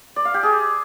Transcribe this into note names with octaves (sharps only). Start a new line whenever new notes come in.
D5
F5
G4
G#4